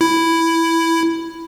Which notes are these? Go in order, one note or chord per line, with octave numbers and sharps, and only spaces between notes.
E4